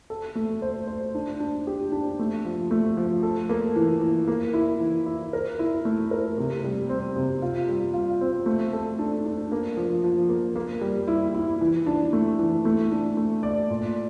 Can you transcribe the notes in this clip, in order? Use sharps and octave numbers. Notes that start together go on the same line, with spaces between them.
A4
A3
C5
C5
D4
D4
G4
D4
A3
F3
A3
F3
A4
A#3
E3
E3
A#3
E4
E3
E4
A#4
E4
A3
A#4
C3
G3
C4
C3
F4
G3
F4
C4
A3
A4
D4
D4
A#3
F3
F3
A#3
A#3
G3
E4
E4
E3
D4
A3
E3
A3
D4
A3
D5
A#2